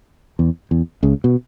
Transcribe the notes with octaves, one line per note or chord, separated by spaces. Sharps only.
E2
E2
C#2 C#3
B2